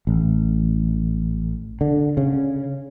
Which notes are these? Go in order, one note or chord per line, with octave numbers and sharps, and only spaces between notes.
A1
D3
C#3